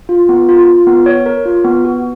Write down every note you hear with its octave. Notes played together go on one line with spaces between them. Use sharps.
F4
B3
F4
F4
B3
C#5
A#4
F4
B3
F#4